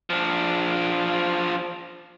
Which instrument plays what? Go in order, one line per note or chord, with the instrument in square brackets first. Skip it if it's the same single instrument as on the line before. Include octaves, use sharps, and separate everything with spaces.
[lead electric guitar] F3 D4